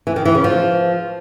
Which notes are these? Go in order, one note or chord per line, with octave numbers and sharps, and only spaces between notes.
E3
D#3
E3
C#3
F3